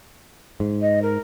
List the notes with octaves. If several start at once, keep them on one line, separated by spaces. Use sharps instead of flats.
G#2
D#5
A#4